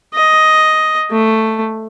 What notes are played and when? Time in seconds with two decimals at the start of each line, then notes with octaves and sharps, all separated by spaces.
0.14 D#5
1.11 A3